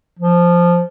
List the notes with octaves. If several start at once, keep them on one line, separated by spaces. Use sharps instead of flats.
F3